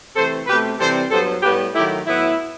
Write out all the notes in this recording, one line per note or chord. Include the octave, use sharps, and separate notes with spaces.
C3 E3 A3 A4 C5
B2 A3 C4 G4 B4
C3 E3 G3 C4 A4 C5
G2 F#3 B3 A4 C5
A2 G3 B3 G4 B4
D#3 F#3 A3 E4 G4
A2 F#3 B3 E4